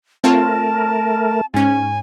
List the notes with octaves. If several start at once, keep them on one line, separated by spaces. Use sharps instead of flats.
A3 C4 F4 A#4 C#5 A5
G#2 C#4 G#5